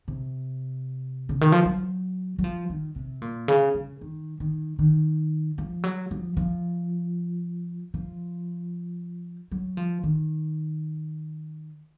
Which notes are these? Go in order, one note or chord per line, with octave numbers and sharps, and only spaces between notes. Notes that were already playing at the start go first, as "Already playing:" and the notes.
C3
C#3
D#3
F3
F#3
F#3
F3
D#3
C3
A#2
C#3
C#3
D#3
D#3
D#3
F3
F#3
F3
F3
F3
F#3
F3
D#3